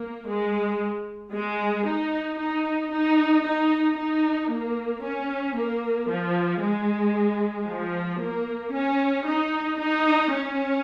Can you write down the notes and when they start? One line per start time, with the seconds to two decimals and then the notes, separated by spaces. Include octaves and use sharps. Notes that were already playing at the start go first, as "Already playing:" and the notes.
Already playing: A#3
0.28 G#3
1.33 G#3
1.86 D#4
2.39 D#4
2.93 D#4
3.45 D#4
3.98 D#4
4.50 A#3
5.03 C#4
5.56 A#3
6.10 F3
6.62 G#3
7.67 F3
8.21 A#3
8.74 C#4
9.27 D#4
9.80 D#4
10.32 C#4